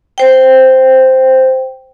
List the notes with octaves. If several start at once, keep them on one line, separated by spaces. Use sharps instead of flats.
C5 G5